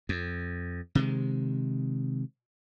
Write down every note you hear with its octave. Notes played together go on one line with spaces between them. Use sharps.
F2
C3 D#3 G#3